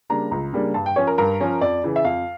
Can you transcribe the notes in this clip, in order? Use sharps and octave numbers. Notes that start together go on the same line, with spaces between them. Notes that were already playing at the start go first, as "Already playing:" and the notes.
C#3 G3 A#3 D4 A#5
C#2 A#5
C#3 G3 A#3 D4
G2 A5
G5
F3 C#4 C#5
A#4
G2 A#4
F3 C#4
F2 D5
C#3 E3
E5
F2 F5